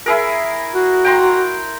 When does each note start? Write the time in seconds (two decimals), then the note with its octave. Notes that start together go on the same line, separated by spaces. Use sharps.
0.06 E4 G#4 A#4
0.74 F#4
1.04 G5 A#5 C6